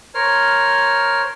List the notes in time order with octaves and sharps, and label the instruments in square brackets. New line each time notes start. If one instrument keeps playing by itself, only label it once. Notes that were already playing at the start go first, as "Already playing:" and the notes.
[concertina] A#4 C5 C#5 F6